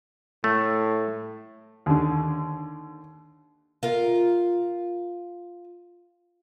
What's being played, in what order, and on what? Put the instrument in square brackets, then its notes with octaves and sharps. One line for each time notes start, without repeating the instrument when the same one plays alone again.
[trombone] A2 [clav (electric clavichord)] A3
[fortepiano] D#2 D3
[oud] F4 A#4